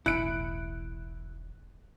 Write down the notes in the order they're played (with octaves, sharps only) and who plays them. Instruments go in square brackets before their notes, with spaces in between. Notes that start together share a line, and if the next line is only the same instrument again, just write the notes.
[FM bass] E1 [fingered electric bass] B1 E2 A2 [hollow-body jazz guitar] E4 [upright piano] F#6 C#7 D7